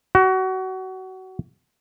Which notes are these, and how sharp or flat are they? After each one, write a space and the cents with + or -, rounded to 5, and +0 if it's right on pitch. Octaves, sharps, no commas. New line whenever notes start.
F#4 +25